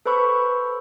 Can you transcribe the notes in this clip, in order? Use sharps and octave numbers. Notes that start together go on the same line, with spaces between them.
A4 B4 C5 B5 C#6 E6